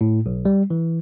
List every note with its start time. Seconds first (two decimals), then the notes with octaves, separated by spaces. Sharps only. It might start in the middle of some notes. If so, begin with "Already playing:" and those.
0.01 A2
0.26 B1
0.45 G3
0.70 E3